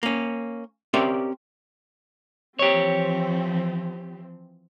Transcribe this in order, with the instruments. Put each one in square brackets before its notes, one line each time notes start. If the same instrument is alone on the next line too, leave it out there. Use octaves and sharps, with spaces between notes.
[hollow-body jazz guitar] A#3 C#4
C4 C#4 G4 A#4 D5 E5
[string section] E3 F3 C4 [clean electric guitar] G4 C#5